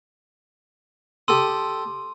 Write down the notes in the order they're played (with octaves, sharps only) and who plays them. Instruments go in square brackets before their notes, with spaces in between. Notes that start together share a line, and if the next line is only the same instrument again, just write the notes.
[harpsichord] G4 A4 D#6 [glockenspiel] C6